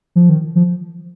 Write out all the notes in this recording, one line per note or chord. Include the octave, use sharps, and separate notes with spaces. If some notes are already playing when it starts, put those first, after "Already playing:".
F3
D#3
F3